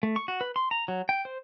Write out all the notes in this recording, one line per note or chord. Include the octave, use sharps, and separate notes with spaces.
A3
C#6
F#4
B4
C6
A#5
F#3
G5
C5